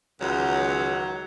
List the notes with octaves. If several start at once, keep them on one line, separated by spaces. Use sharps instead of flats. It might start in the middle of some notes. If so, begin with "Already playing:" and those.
C#2 D#3 E3 F#3